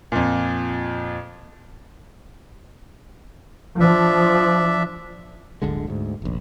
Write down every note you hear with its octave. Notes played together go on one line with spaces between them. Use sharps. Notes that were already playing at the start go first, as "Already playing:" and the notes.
F2 A#2
F3 D4 E5
D1 G1 D3 G#3
D2 G#2
F1 A#1